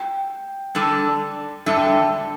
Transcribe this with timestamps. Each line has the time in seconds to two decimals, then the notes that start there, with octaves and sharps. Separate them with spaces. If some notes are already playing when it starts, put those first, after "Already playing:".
Already playing: G5
0.75 D3 G3 D4 A4
1.66 D3 G3 D4 A4 E5
1.76 G5
1.87 E5